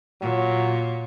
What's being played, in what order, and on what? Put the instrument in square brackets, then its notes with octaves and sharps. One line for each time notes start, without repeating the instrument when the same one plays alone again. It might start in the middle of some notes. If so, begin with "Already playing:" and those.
[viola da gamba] A#2 [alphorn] F#3